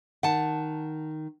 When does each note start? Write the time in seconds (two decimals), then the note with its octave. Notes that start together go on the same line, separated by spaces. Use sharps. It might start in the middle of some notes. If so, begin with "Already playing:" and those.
0.23 D#3 F#5 A5